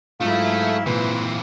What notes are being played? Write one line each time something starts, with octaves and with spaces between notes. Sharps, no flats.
G#2 F#3 A3 E4 F4 F5
A#2 E3 C4 B4